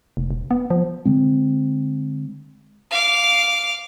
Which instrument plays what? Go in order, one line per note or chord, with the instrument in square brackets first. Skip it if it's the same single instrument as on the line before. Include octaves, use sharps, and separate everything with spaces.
[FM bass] F1
E1
B3
F3
[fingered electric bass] D3 G#3 C4
[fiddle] F5 D6